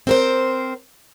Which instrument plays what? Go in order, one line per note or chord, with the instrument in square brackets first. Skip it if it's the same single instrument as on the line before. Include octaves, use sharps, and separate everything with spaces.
[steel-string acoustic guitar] C4 A#4 C5